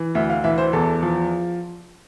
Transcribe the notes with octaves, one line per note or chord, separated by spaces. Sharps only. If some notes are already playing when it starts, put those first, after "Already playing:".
Already playing: E3
D2 E5
F5
E3 E5
C5
E2 A4
F3